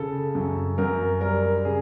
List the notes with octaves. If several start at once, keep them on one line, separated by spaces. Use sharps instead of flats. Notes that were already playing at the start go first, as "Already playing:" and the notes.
Already playing: C#3 A4
F#2
F#2 A#4
G3 A#4
C#3 G#4